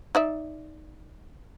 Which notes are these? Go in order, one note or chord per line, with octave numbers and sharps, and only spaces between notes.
D#4 D5 E5